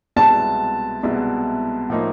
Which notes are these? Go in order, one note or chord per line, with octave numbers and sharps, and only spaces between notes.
C2 B2 G#3 B3 E4 A5
C2 B2 G#3 B3 E4
A2 F3 A#3 D#4